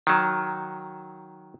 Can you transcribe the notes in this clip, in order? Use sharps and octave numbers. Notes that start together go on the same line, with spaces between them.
D#3 F#3